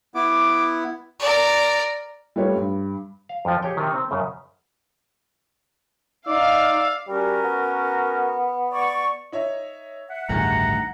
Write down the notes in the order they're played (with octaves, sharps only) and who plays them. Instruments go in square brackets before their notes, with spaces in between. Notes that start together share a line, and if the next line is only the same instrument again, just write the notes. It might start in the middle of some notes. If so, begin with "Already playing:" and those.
[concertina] B3 E4 [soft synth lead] D6
[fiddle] A#4 D5
[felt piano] G3 A3 F4 B4 C#5
G2
[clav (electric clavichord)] F5
F2 F3
G4 G#4 C#5 G5
C3 D#3
C4
F#2 C#3
[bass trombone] D#4 [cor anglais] D5 [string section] F5 [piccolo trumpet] E6
[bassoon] G3 [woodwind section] C#4 F#4 A#4
[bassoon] B3
[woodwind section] D5 C#6
[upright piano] D#4 C#5 E5
[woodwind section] E5 F#5
[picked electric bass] A1 D2 G2 [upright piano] D#3 G#4 [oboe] A#5